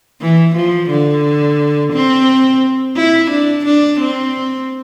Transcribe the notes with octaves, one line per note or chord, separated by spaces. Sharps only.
E3
F3
D3
C4
E4
D4
D4
C4